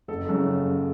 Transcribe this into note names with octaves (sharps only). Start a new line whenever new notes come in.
F#1 A4
F#2 C#3